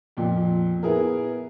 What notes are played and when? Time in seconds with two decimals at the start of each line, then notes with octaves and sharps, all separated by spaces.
0.17 F2 A#2
0.83 B3 E4 G#4 A#4